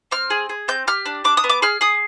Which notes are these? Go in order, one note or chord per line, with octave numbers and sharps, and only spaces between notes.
C4 F6
G#4
G#4
C4 G6
G4 F6
D4
D4 D6
D#6
B3
D6
G#4 F6
G#4 D#6